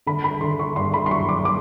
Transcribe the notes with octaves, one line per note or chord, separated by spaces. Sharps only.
D3 B5
B5
D3 C6
C#6
G2 C6
B5
C6
F#3 C#6
D6
D6